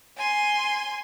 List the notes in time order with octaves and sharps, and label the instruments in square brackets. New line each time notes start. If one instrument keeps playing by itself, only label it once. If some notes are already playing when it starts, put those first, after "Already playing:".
[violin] G#5 C6